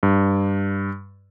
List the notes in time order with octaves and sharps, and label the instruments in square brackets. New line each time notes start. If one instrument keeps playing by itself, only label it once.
[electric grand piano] G2